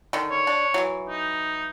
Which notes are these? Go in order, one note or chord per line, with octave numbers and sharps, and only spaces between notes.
D3 D#3
C#5
D4
E3 F#3
D#4